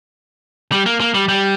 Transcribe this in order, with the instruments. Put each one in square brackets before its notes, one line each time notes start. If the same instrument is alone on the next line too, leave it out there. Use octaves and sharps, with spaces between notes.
[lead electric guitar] G3
A#3
A#3
G3
G3